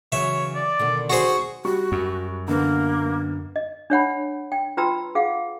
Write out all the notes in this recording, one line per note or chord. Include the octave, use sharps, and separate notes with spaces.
C#3 E3 F#3 C#5 E5
D5
B2 D3 D#3
F#4 G#4 C5 C#6
G3 F#4 C#6
F#2
D3 A#3 B3
D#5
D4 C#5 F#5 B5
G5
F4 B4 G5 A#5 C6 E6
G#4 F5 F#5